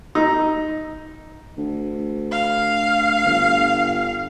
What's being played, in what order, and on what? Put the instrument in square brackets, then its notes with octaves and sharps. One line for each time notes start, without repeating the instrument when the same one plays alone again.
[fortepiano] D#4
[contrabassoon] D2
[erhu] F5
[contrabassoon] G1